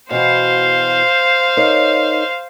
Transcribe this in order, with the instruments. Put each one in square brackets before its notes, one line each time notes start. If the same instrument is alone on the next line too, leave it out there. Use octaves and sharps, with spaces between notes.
[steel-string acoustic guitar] B2 E3 F#4 [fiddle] C5 F5
[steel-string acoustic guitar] D#4 A#4 C#5